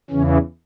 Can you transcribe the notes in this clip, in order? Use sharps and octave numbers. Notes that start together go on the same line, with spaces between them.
E2 C#3 E3 C#4